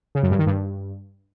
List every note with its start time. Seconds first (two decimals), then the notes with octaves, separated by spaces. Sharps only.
0.15 C#3
0.23 F#2
0.31 G2
0.39 D#3
0.47 G2